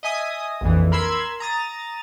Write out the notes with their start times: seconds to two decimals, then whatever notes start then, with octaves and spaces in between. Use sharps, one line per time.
0.03 D#5 E5 G#5 D#6
0.61 A#1 F2 E3
0.92 A#4 B5 C6 E6 G#6
1.40 A#5 D#6 A6